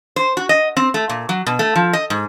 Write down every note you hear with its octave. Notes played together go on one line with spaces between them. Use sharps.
C5
F#4
D#5
C4
A3
A#2
F#3
B2
A3
F3
D#5
G#2